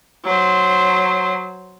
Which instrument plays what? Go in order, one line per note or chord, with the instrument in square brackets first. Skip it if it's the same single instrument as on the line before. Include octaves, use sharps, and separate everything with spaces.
[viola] F#3 C5